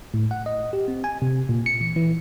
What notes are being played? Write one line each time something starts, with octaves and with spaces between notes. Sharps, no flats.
A2
F#5
D#5
G4
C4
G#5
C3
A#2
C#7
E3
E3